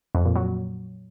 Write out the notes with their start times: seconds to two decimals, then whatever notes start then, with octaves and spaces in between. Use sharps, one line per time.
0.15 F2
0.25 A#2
0.36 F#3